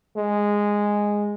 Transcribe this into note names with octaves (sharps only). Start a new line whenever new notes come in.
G#3